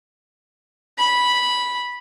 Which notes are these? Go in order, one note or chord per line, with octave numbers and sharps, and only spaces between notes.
B5